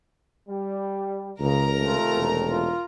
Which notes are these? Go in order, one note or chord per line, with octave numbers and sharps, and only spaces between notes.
G3
C#2 C#3 A#4 A#5
C3 D#3 A3 F4
E1
F4